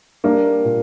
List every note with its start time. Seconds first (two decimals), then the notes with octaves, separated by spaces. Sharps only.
0.24 G3 A#3 D4
0.65 A#2